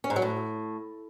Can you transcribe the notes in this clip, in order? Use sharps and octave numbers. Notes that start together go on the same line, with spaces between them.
C#4
G#2
F#3
A2